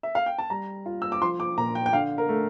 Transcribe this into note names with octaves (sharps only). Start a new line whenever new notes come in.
E5
F5
G5
A5
G3 A#5
F4
E6
D6
F3 C6
D6
A#2 A#5
G5
G5
D3 F5
A#4
A3